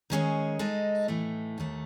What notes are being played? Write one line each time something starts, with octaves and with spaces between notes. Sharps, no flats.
D#3 G#3 C#4 G#4 C#5
G#3 D#4 A4 D#5
A2 E3 A3
D#2 D#3 A3